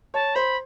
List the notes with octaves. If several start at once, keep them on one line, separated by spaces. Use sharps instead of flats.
C#5 A5
C5 B5